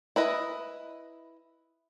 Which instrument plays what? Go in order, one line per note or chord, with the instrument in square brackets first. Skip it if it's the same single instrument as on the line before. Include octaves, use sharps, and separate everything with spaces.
[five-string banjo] E4 B4 D#5